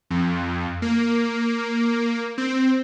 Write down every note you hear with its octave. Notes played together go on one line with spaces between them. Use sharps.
F2
A#3
C4